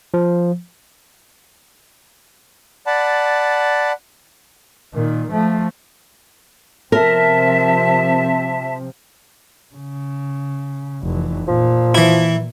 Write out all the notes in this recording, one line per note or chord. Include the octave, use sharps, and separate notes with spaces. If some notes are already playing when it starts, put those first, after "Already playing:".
F3
D5 F#5 A5 B5
A#2 D#3
F3 A3
C3 F3 C4 A#4 E5 A5
C#3
F1 E3
A#2 F3
E3 E4